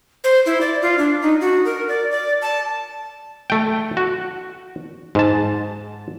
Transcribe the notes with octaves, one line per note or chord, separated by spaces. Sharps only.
C5
E4
D5
F4
D4
D#4
F#4
A#4
D5
D5
A5
A3 G5
F#4
G#2 A5